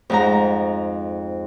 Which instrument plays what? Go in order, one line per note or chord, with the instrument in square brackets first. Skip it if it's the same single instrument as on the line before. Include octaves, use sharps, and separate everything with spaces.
[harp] F2 G#2 A#5